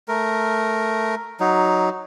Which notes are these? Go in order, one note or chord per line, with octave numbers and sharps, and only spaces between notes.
A3 A#4
F#3 D#4